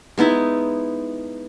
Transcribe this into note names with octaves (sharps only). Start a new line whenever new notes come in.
G#3 B3 D#4 E4